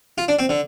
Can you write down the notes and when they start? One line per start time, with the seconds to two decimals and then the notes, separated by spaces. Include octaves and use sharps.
0.18 F4
0.28 D4
0.39 C4
0.49 D3